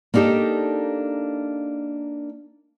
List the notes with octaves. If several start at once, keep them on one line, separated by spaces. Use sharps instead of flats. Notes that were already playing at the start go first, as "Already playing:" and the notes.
A#3 D4 D#4 G4 A4